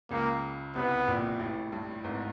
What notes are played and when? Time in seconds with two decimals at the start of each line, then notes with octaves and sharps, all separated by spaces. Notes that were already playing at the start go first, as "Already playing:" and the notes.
0.10 C#2 C#3 A#3
0.75 C2 C3 B3
1.08 A#1 A#2
1.39 A1 A2
1.72 G2
2.04 G#1 G#2